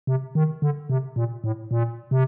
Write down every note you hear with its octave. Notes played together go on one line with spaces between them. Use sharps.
C3
D#3
D3
C3
A#2
A2
A#2
C3